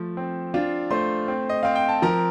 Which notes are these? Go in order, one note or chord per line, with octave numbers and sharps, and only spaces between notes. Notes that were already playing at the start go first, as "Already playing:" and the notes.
Already playing: F3 A3
C4
D4 F4 F5
A3 C5 C6
C4
D#5
C4 F5
G5
A5
F3 A#4 A#5